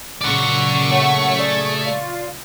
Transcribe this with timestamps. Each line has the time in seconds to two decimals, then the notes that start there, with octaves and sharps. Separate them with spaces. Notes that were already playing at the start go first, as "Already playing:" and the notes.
0.21 A#2 C#3 F#3 D5 F#5 C#6 B6
0.91 A3 C#5 F#5
1.38 G#4 D5
1.85 F4 D5